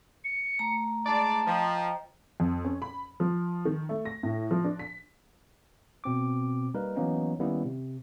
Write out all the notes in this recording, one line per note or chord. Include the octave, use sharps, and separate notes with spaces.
C#7
A3 A#5
G#3 D#4 D5 A5
F3 D#5 G5 A#5
F2
C#4
B5
F3
D#3
A3
A#6
A2
F3
D4
B6
B2 C4 D6
G3 A#3 D#4 A#4 B4
E3 F#3 A#3 B3 C#4 D#4
D#3 G3 A#3 B3 C#4 E4
C3